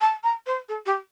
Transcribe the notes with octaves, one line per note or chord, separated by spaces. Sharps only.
A5
A#5
C5
A4
G4